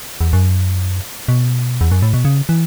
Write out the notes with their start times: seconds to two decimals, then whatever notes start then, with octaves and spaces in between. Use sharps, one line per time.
0.21 E2
0.33 F#2
1.28 B2
1.81 E2
1.92 F#2
2.02 A2
2.14 B2
2.25 C#3
2.49 E3